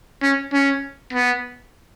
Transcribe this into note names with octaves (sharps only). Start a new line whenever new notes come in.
C#4
C#4
B3